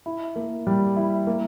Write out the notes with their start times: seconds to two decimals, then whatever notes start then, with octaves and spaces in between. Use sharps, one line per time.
0.06 E4
0.36 A#3
0.67 G3
0.96 E4
1.27 A#3